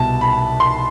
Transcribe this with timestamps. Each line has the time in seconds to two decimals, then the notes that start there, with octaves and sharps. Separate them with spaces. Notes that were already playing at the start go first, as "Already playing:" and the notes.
Already playing: C2 B2 A5
0.21 B5
0.60 C6